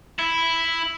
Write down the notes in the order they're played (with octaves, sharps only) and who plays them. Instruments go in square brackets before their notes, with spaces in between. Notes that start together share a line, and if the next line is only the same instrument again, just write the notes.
[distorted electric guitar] E4